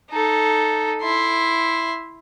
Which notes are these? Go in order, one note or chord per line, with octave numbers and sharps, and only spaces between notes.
D#4 A4
E4 C6